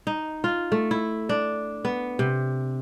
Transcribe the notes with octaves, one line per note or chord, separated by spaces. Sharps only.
D#4
F4
A3
E4
D4
B3
C3